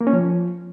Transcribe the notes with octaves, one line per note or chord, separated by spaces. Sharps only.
A#3
C#4
F3